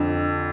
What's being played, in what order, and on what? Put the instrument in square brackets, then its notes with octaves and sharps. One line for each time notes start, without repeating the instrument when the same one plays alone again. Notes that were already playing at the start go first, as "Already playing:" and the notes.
Already playing: [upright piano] F2 D3